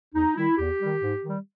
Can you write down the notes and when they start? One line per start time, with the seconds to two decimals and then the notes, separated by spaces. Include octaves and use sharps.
0.13 E2 D#4
0.36 D#3 G3 E4
0.58 E2 G4
0.80 D#3 G3
1.02 G#2
1.24 D#3 G3